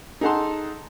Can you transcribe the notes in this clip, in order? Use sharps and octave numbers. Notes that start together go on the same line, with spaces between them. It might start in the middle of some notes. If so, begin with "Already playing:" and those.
D#4 G#4 A4 F#5 A5 C6